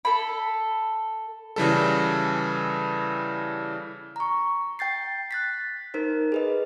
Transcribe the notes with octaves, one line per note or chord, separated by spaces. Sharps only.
A4 B5
C#3 E3 G3 A4
A#5 C#6
G5 G6 A6 C7
F#6 A6 B6
D#4 A#4 C5
G#4 B4 D#5